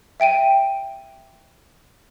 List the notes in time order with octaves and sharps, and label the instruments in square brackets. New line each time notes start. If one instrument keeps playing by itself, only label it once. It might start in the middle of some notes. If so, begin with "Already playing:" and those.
[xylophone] E5 G5 D7 D#7